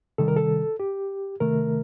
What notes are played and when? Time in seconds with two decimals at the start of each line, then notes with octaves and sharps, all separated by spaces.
0.18 C3 D#3 G3 A4
0.28 A#4
0.37 A4
0.80 G4
1.40 C3 D#3 A3 A#4